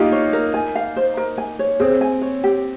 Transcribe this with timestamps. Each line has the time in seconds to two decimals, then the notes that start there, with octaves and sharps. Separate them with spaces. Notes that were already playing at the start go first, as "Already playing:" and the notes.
Already playing: A#3 D#4 F4 G4
0.12 C#5
0.33 A#4
0.54 G#5
0.75 F5
0.96 C5
1.17 A#4
1.38 G#5
1.59 C#5
1.80 C4 G#4
2.01 G#5
2.22 C#5
2.44 G4